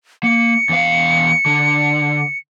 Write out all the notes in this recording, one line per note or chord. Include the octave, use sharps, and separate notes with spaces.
A#3 C#7
E2 F5
D3